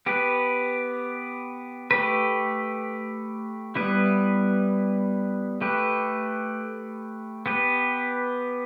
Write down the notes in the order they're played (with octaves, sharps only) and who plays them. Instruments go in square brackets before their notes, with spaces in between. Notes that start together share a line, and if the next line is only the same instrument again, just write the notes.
[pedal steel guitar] B3 G4 B4
A3 G4 B4
G3 B3 E4 B4
A3 G4 B4
B3 G4 B4